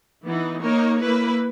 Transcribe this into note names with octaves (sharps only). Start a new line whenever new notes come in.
E3 B3 D#4
A#3 D#4 A#4 C#5
A#3 E4 B4